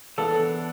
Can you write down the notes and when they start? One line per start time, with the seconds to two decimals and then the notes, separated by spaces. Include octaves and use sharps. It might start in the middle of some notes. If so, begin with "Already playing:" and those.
0.18 E3 B3 D4 A4